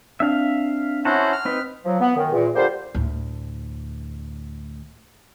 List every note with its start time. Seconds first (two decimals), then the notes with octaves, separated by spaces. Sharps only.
0.20 C4 D4 E5 F5
1.05 C#4 E4 F#4 C5 F#5 A5
1.33 F6
1.45 C4 D#4 B4
1.85 F3 F#3
2.00 B3
2.16 F#2 D#3
2.31 E2 A#2
2.55 D3 G3 A#3 F4 G4 C5
2.95 D2 A2